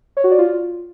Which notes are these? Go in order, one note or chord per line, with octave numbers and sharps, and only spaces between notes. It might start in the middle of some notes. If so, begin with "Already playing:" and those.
C#5
F#4
D5
F4